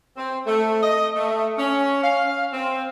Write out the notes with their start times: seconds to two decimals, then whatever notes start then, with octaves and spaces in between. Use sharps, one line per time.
0.17 C4
0.46 A3
0.83 D#5
1.15 A3
1.58 C#4
2.03 F5
2.53 C4